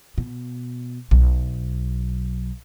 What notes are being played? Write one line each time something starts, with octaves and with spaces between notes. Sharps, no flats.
B2
B1